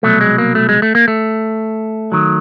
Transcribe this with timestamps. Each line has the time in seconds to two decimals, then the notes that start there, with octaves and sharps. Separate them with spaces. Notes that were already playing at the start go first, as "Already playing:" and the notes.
0.03 C2 B2 F#3 A3
0.21 G#3
0.38 A#3
0.55 A3
0.69 G#3
0.82 A3
0.95 A#3
1.08 A3
2.12 D#3 F#3